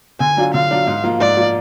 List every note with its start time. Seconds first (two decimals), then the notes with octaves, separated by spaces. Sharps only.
0.20 D3 G#5
0.37 F#3 D4 F4
0.54 D3 F5
0.70 F#3 D4 F4
0.87 G#2
1.04 F3 A#3 F4
1.20 G#2 D5
1.37 F3 A#3 F4